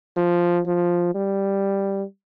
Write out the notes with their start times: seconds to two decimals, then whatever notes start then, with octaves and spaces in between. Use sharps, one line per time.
0.16 F3
0.66 F3
1.15 G3